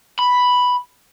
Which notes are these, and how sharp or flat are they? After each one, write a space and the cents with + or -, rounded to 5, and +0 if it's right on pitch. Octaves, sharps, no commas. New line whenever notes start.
B5 +0